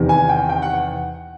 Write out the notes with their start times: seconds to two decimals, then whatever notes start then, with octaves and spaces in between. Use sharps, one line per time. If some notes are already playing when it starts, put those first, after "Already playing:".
Already playing: E2 C3 D#3
0.09 G#5
0.29 G5
0.49 G5
0.62 F#5